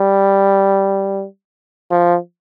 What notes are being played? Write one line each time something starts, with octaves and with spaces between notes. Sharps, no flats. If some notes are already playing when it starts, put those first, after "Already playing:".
Already playing: G3
F3